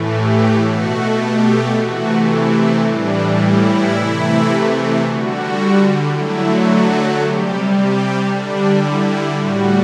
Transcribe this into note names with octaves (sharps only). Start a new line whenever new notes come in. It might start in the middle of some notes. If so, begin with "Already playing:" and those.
Already playing: A2 E3 A3
G4
B2 A3 F#4
G4
C3 E3 A3 F#4
E4
A2 E3 G3 D4
E4
C3 E3 A3
D3 G3 F#4
D3 F#3 A3 E4
F#4
C3 G3 G4
G4
D3 G3 D4
E4
A2 G3 F#4